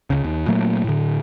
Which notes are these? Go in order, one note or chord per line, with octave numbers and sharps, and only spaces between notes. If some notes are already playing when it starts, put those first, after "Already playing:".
C#2 C#3
D#2
A#2 F#3 A3 A#3
A2 D3